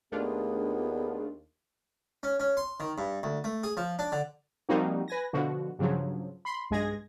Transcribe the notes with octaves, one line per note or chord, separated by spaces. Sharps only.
D#2 A3 B3 D4 F4 G#4
C#4
C#4
C6
D#3
G2
D2
A3
G#4
F3
D4
D3
F3 G3 A#3 C4 D#4 F#4
B4 G#5 A#6
B2 D3 F3 F#4
G2 C#3 F3 F#3
B5 C6
B1 G2 G#3 G#4 G#6 A#6